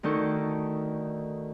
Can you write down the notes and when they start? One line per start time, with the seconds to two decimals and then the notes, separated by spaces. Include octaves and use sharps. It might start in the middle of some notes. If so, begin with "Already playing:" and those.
0.03 D2 D#3 D#4 A4 C#6